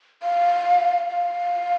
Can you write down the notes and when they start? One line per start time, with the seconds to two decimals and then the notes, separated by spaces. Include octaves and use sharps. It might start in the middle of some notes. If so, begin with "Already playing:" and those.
0.23 F5
1.10 F5